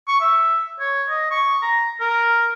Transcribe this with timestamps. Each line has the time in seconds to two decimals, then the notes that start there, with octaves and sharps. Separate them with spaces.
0.08 C#6
0.21 E5
0.80 C#5
1.09 D#5
1.31 C#6
1.62 A#5
2.01 A#4